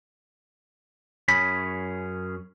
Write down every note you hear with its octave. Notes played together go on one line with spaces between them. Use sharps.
F#2 C#4 G#4 B5